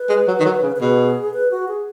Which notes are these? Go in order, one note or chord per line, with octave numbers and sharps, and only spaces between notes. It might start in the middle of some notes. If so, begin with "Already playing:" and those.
Already playing: B4
G#3
F#3
D#3
F#3
C#3
B4
B2 G#4
B4
F#4
G#4